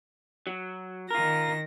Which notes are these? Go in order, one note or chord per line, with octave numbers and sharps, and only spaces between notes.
F#3
D#3 F4 A#4 A#6